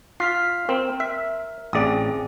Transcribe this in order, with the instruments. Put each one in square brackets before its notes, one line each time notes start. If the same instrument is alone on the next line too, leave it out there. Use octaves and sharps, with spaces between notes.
[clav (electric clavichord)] F4 [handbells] F6 B6 C7
[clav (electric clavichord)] C4 [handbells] A#4
[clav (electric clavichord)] E5
[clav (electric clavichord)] A1 D5 [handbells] C4 G#4 D#6